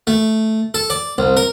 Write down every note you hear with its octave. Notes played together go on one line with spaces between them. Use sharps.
A3
A4
D5
C2
A#4